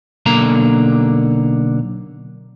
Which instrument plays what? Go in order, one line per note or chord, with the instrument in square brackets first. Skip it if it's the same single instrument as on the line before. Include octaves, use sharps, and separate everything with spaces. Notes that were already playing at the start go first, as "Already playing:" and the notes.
[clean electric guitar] B1 D3 A#3 A#5